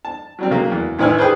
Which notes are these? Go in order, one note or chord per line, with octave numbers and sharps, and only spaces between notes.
A5
F#3 G3 C4
C#3 F#3 A#3
E2
A1 D#3 E4 B4 G#5 F6
G4 G#4 B4 C5